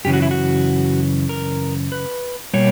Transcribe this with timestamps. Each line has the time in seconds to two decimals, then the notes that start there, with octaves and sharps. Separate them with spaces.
0.05 F#2 C#3 E3 G4
0.14 F#4
0.22 E4
0.31 F#4
1.29 A#4
1.92 B4
2.54 B2 G3 A#3 C#5